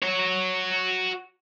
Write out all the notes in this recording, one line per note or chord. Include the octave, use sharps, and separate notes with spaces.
F#4 C#5